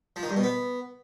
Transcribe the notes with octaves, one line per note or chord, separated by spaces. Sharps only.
F3
D#3
G2
B2
B3